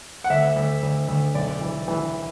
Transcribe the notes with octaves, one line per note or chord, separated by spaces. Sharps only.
F#5
D2 E5
D2
D2
D2
B1 D5
E3
E3